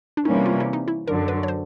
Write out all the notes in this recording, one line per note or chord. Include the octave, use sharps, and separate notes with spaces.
D4
C3 E3 G3 A#3 C#4 D#4
F4
E4
D#4
E4
F#2 D3 F#3 A#4
B4
C#5
C5